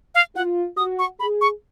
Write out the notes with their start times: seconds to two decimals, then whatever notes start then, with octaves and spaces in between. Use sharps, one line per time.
0.15 F5
0.35 F4 F#5
0.77 F#4 D#6
0.99 C#6
1.19 G#4 B5
1.41 C#6